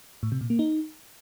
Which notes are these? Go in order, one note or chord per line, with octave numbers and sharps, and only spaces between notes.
A2
C3
A#2
A#3
D#4